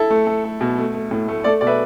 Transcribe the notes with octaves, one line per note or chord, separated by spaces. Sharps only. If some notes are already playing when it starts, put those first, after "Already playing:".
Already playing: E4 A4
A3
A3
A3
B2
A3
A3
A2
A3
A3 A4 D5
B2 D5
B4 E5